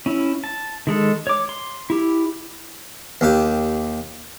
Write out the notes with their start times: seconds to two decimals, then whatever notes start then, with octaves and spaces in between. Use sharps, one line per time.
0.06 C#4 E4
0.44 A5
0.87 D#3 G#3 A4
1.27 C#5 D6
1.49 C6
1.90 E4 G4
3.21 D#2 G4